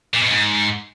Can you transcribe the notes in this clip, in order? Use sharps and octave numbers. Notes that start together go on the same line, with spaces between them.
A#2
B2
G#2